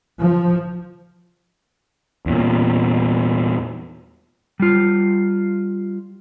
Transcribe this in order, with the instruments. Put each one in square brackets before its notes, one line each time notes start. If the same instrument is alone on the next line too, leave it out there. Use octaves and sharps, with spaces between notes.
[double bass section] F3
[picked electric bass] E2 A#2
[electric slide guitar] G3 F4